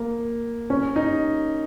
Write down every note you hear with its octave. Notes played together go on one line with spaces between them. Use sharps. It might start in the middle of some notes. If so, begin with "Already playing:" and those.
Already playing: A#3
C#4
D#4